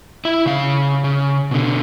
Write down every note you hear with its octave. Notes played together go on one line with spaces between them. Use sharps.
E4 E5
C#3 F5
C#3
B2 D3